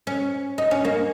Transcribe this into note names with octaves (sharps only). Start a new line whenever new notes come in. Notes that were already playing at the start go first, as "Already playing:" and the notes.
C#4
D#4
C#4
A#3